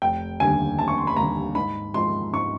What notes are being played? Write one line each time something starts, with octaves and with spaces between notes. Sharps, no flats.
F1 G5
D#2 D3 G3 G#5
F1 A5
C#6
C6
B5
D#2 D3 G3 A#5
G#2 B5
F3 G#3 C6
G#2 C#6